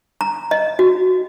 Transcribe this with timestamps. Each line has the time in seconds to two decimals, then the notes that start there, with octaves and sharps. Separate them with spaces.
0.21 A#5
0.51 D#5
0.79 F#4